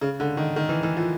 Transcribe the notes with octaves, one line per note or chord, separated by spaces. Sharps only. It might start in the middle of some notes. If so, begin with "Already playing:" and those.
C#3
D3
D#3
D#3
E3
E3
F3